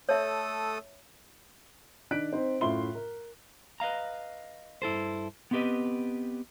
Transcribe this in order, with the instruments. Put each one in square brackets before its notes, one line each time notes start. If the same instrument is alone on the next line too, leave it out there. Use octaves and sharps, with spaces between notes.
[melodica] A3 A4 D#6 [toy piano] C#5 E5
[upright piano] D#3 D4 F#6 B6 D7
C4 D#4 C5
F#2 A2 F4 E5 C6 G7
A#4
[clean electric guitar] B4 D#5 F5 A#5
G2 E4 A4 C5
B3 C4 E4 G4 B4 D#5